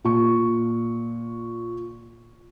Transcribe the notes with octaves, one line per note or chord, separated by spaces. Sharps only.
A#2 C#6